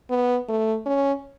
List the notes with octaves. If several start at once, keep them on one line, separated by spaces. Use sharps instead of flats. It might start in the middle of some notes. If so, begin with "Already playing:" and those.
B3
A3
C#4